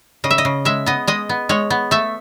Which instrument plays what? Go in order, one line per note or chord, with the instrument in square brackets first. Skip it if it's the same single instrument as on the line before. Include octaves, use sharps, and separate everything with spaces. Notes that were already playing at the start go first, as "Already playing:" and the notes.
[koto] C#3 D#5
E5
D#5
C#3
G#3 E5
B3 D#5
G#3 D#5
B3
G#3 C#5
B3
A3 E5